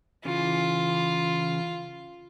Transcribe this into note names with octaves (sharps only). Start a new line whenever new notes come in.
C#3 E3 F4